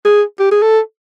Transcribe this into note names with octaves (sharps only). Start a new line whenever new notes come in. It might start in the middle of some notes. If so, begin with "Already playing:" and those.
G#4
G4
G#4
A4